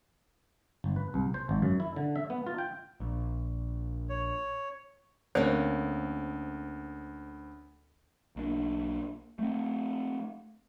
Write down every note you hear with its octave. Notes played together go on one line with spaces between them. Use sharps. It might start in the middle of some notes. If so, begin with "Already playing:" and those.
G1
B4
C2
C5
G#1
F#2
E4
D3
E5
B3
F4
G5
A#1
C#5
D2 A#3 C4 C#4 C5
B1 A#3 D4
A3 C4